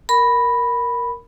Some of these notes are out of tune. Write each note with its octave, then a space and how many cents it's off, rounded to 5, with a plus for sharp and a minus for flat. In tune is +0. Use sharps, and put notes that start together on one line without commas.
A#4 +0 B5 +0